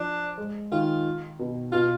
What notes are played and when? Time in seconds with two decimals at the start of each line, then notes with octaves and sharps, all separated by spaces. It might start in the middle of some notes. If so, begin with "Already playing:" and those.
Already playing: F3 D4
0.38 G#3
0.72 D#3 F4
1.39 B2
1.72 B2 F4